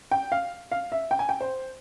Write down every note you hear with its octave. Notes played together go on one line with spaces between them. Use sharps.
G5
F5
F5
E5
G5
G#5
G5
C5